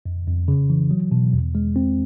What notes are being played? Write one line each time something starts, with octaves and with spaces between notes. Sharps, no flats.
F2
F2
C#3
E3
F#3
B2
E2
G#3
C4